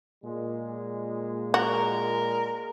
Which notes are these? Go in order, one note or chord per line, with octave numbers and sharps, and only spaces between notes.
A#2 G#3
F#4 A#4